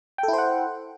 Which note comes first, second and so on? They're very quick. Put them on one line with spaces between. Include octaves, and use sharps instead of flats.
G5 A4 E4 C5 F#5